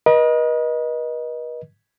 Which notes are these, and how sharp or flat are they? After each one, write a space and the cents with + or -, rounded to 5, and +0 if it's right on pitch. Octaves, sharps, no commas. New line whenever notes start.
B4 -45 D#5 +0